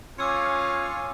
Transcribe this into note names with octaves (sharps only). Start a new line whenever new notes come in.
C#4 F4 C#5 F5 G#5 D6 E6 C#7